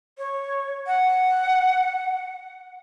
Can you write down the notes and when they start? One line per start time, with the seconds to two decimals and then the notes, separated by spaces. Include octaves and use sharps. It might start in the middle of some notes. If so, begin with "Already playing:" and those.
0.18 C#5
0.87 F#5